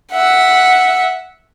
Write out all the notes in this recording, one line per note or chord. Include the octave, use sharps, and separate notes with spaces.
E5 F#5